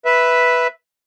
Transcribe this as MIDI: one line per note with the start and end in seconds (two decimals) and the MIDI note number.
0.05 0.67 71
0.05 0.67 76